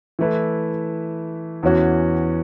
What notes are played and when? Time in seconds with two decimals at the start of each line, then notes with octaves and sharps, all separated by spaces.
0.19 E3 A3 E4 B4
1.63 E2 E3 C#4 F#4